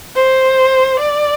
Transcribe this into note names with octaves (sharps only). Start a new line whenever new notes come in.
C5
D5